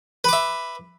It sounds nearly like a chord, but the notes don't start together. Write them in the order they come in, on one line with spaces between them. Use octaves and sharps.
B4 D6 E5